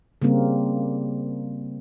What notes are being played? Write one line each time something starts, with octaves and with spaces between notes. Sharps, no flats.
C#3 G3 A#3 C4